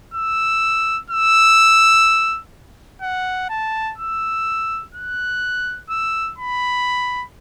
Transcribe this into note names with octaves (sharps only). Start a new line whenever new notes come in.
E6
E6
F#5
A5
E6
F#6
E6
B5